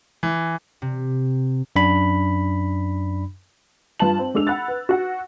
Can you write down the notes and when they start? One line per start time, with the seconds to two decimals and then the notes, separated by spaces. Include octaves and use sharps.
0.23 E3
0.82 C3
1.76 F#2 D4 B5
4.00 G2 F4 B4 A5 F#7
4.19 C4
4.34 G#3 D4 A4 E6 F7
4.47 F#5 B5 F#6 A6
4.68 B4
4.89 F#4 F#5